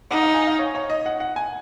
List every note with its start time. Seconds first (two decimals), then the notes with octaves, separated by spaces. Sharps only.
0.11 D#4 F#5
0.23 F5
0.34 G#5
0.47 F5
0.59 C#5
0.75 C#5
0.90 D#5
1.06 F#5
1.20 F#5
1.36 G#5